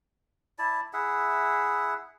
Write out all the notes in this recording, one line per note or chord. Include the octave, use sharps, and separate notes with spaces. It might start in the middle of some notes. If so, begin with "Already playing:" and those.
E4 D5 A5
E4 G#4 E5 F#5